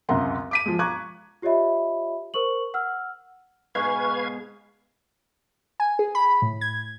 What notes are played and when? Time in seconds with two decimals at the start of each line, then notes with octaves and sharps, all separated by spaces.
0.09 C#2 F#2 C3 F#5 A#5 C6
0.51 D6 B6 D#7
0.66 F3 G#3
0.79 A#5 C#6 D6 F#6 G#6
1.42 F4 G4 C#5 D#5 E5 B5
2.34 A#4 C5 C#6 F#7
2.74 F#5 E6 F6
3.75 G#2 B2 B4 F5 C#6 G#6
5.80 G#5
5.99 G#4
6.15 B5
6.42 A2
6.61 G#6